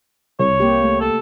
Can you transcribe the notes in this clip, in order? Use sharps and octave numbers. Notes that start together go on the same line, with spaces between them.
C2 C#5
C3 A#3 G4
A3
A4